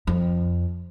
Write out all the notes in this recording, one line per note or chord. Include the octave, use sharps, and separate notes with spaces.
F2